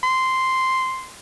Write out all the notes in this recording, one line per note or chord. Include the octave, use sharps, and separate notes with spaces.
C6